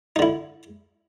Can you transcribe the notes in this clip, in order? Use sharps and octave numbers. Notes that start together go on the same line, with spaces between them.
D3 D#4 E4